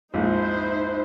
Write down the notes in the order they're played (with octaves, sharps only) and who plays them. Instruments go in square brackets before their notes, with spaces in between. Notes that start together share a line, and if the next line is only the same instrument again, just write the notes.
[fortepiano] A#1 F2 G#2 [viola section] D#4 E4 C5